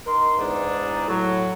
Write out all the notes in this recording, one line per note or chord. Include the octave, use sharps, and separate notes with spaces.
D#4 A#4 C6
E2 G#2 D4 D#4
A2 F#3